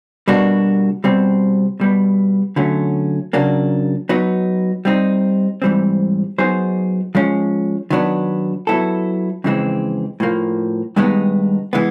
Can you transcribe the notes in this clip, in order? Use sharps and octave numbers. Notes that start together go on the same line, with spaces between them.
B2 G3 A#3 D4 F#4
B2 G3 C4
B2 G3 B3
D3 F#3 A3 C#4
C#3 F#3 A#3 D4
F#3 B3 D#4
G3 C4 D#4
G#2 E3 G3 C4
F#3 B3 D#4 G#4 C5
F3 G#3 C#4
D#3 F#3 B3 D4
F#3 B3 E4 A4
F2 C#3 E3 G#3 C4
A2 F3 A#3
G2 D#3 G#3 B3 D#4
E3 G#3 B3